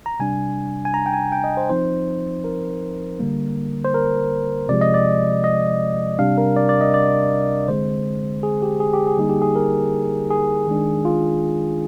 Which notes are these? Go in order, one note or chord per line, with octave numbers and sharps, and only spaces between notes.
A#5
C3 G3 D4 G#5
G#5
A#5
G5
G#5
G5
D#5
C5
F3 C4 D#4 C5
A#4
D3 G3 A#3
C5
A#4
C3 F3 G#3 D5
D#5
D5
D#5
C3 G3 D4 F5
A#4
D5
D5
D#5
D5
D3 G#3 C4 C5
G#4
G4
G#4
G4
G#4
D3 G3 A#3 D#4
G4
G#4
A#4
G#4
D#3 G#3 D4
F4